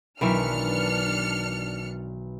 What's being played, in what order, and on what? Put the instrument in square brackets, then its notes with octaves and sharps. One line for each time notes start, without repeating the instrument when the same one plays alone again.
[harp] B1 B5 [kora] D#3 E3 E5 [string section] D4 F6 C#7